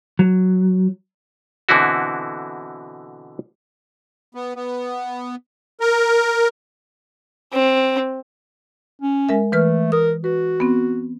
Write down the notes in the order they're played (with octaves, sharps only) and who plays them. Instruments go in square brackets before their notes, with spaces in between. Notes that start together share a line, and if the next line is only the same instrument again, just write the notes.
[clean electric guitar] F#3
[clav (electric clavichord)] B2 D3 E3 C4 E4 F#4
[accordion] B3
B3
A#4
[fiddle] C4
[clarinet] C#4
[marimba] G#3 A#4 E5
[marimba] E3 B4 F6 [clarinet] A3
[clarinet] A#4 [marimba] D#6
[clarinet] F#4 [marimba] B4
[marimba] B3 C4